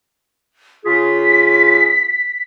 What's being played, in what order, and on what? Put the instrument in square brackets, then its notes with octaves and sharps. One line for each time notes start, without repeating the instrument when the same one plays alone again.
[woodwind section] C#3 F4 G#4 [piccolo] B6